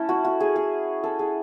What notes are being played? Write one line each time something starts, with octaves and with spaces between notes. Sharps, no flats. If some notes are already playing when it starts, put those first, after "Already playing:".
Already playing: A3 C#4 E4 A4
F#4
F#4
G#4
G#4
A4
G#4